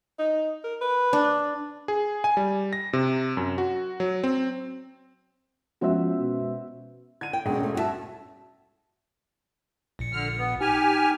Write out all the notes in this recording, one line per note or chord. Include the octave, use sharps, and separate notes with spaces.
D#4
A#4
B4
D4
G#4
G#5
G3
A#6
C3
F#2
F#4
F#3
C4
F3 G#3 B3 C#4 F#4 C5 E5
B2
D3 G#6 D#7
G5
E1 B2 F#3 G#3 C#4
A3
G2 F#4 G4 E5 A5
A#1 A#2 C#7
D3 F6
B3
D#4 G4 G#5 F6